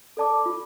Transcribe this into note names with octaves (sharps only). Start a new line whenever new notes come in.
A4 D5 A5 D6
F4